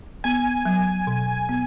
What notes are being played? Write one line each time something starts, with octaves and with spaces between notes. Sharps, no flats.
B3 G#5
F#3
B2
B3